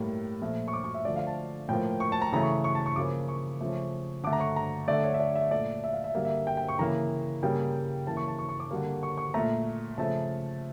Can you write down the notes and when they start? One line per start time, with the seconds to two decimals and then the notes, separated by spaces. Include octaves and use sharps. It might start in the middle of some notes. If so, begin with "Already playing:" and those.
Already playing: A2 G3 A#3
0.42 A#2 F3 A3
0.68 C#6
0.73 D6
0.84 C#6
0.94 E5
1.05 D3 F3 A3 D5
1.16 F5
1.27 A5
1.69 A2 F3 A#3 G5
2.00 C#6
2.12 A5
2.22 A#5
2.33 C#3 E3 A3 A#5
2.43 C#6
2.64 C#6
2.75 A5
2.86 C#6
2.96 C#3 F3 A#3 D6
3.28 C#6
3.61 C#3 F3 A3
4.24 D3 A3 D6
4.33 A#5
4.40 C#6
4.56 A#5
4.88 D3 A3 D5
5.04 C#5
5.14 E5
5.20 D5
5.35 E5
5.51 A#2 A3 D5
5.84 E5
5.93 F5
6.04 E5
6.15 D3 G3 A#3 F5
6.25 E5
6.47 G5
6.57 G5
6.68 C#6
6.79 C#3 E3 A#3 A#5
7.43 C#3 G3 A#3 G5
8.06 C#3 E3 A#3 A5
8.17 C#6
8.28 A5
8.38 C#6
8.49 C#6
8.60 D6
8.71 D3 G3 A#3
9.03 C#6
9.18 C#6
9.34 A#2 A3 A#5
9.98 C#3 F3 A3 A5